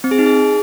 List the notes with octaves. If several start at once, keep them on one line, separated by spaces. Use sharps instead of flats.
C4
G#4
D#4
G#4